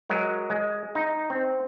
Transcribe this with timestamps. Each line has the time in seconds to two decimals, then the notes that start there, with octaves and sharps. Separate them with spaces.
0.09 F#3 G#3 A#4
0.50 G#3
0.95 D#4
1.30 C4